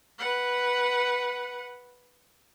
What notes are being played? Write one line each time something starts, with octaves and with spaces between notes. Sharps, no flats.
B4 F#5